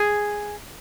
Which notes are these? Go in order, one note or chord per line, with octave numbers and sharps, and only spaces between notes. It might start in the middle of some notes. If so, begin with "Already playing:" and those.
Already playing: G#4